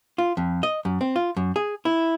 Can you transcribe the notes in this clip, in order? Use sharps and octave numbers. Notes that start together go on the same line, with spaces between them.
F4
F2
D#5
F#2
C4
F4
F#2
G#4
E4